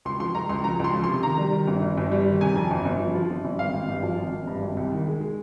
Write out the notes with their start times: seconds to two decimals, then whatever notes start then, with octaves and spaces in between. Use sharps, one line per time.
0.05 C#2 C6
0.20 F3 C6
0.35 C#2 A#5
0.49 C#2 C6
0.64 F3 A#5
0.80 C#2 C6
0.94 F3
1.04 C6
1.09 C3
1.23 D#3 A#5
1.38 G3
1.52 D#3
1.67 G1
1.82 G1
1.98 G1
2.12 G3
2.27 D#3
2.41 C3 G#5
2.56 F2
2.71 G1
2.85 G1
3.00 F3
3.15 F3
3.30 G1
3.45 G1
3.59 G#1 F5
3.73 G#1
3.89 G2
4.03 F3
4.18 G#1
4.33 G#1
4.47 G2
4.62 G#1
4.77 C2
4.92 D#3
5.07 G#3
5.21 G#3